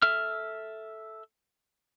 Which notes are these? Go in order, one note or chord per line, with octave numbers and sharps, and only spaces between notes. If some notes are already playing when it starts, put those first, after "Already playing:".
A4 E5 F6